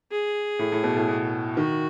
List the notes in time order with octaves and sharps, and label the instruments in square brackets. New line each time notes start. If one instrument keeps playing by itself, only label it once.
[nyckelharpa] G#4
[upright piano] A2
A2
B2
A2
B2
[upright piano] D#3 [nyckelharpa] F#4